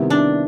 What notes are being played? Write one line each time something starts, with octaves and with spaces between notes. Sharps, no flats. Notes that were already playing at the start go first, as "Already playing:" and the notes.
Already playing: C3 D#3 G3 B3 E4
D4